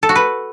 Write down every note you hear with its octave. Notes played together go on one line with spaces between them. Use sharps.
A4
F#4
B4